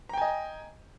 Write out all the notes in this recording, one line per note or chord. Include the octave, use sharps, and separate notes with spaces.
D#5 G5 G#5 A#5